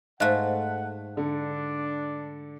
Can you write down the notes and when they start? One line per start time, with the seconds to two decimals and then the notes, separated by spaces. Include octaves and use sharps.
0.20 G#2 A3 D#5 F5 F#5 F#6
1.17 D3 D4